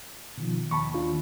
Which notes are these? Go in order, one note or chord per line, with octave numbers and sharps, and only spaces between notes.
B2 D#3 F3
D#2 A5 B5 C#6
D4 F4